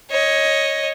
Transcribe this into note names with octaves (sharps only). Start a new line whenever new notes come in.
C#5 D#5